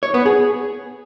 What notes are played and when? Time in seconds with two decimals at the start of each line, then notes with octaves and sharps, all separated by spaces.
0.03 C#5
0.14 B3
0.26 G#4